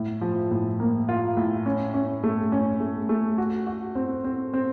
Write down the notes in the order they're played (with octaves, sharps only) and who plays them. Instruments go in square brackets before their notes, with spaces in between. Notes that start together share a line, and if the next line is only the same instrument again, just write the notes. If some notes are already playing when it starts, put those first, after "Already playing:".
Already playing: [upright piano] A2
F3
A2
A#3
F4
A2
C#4
C#4
A3
C#4
A3
A3
F#4
F#4
C4
C4
C4